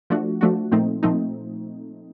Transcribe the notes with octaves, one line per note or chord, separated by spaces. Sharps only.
F3 A3 D4 F#4
F3 A3 D4 F#4
A#2 F3 A3 C4 D#4
A#2 F3 A3 C4 D#4